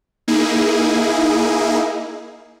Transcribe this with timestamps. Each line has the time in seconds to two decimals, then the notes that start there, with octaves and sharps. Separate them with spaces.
0.28 A#3 D#4 E4 G#4